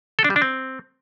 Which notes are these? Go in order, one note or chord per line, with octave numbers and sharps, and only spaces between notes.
A4
D4
G3
D4
C4